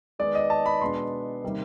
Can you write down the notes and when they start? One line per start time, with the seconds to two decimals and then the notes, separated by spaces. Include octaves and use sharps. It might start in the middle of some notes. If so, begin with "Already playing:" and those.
0.19 D#3 G#3 B3 D#4 D5
0.35 D#5
0.50 A5
0.66 B5
0.81 B2 G#3 B3 D4 C6
1.44 C3 D#3 G3 A#3